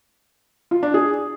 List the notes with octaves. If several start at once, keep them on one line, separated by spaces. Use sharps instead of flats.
F4
D4
G#4